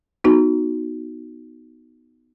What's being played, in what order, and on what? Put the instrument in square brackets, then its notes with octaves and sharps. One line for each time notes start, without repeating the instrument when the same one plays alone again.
[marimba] B3 D#4 F#4